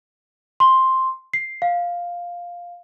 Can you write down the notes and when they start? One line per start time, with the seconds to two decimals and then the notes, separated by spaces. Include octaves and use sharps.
0.60 C6
1.34 C7
1.62 F5